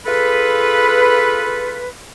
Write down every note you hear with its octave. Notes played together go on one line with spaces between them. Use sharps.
F4 G#4 A4 B4